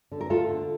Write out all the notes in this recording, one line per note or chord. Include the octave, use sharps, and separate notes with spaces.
D3
A#4
A3 F4 A4
D3